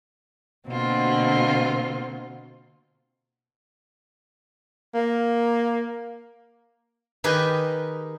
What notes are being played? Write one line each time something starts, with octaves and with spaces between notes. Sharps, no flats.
B2 D3 A#3 C4 F4 F#4
A#3
D#3 D#4 G4 G#4 B4 D#5